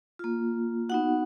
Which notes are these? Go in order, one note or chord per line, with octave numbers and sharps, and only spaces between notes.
A#3 F4
B3 D#4 F#4 F#5